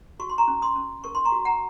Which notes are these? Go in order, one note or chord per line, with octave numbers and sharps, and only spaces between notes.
F#4 C#6
C6
A#5 C#6
C#4
C6 D#6
C#4
A#4 C#6
C6
A#5 C#6
F#4
F#5 A#5